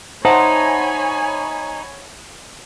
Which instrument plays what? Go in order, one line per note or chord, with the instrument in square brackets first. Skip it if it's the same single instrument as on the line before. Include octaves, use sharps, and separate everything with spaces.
[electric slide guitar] D#4 [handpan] C5 [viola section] C#5 G#5 B5 [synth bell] E5 F#5 A5